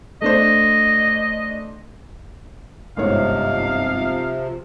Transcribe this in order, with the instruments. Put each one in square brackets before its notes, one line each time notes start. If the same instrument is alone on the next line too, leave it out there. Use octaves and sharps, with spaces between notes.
[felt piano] A3 D4 C5 [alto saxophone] D#5
[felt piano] G1 G#2 C#5 [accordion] C3 F3 [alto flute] D#4 [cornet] F5